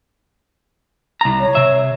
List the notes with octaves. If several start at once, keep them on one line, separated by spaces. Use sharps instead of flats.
C2 A#5
C#5
C3 E5